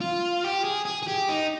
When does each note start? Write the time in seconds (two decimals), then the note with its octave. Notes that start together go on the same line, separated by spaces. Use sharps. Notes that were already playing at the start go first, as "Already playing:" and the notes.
0.01 F4
0.44 G4
0.64 G#4
0.85 G#4
1.03 G#4
1.08 G4
1.29 D#4